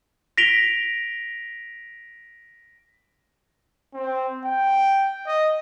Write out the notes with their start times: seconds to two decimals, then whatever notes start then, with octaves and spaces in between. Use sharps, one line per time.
0.38 A#6 B6 D7 F7 G7
3.94 C4
4.44 G5
5.26 D#5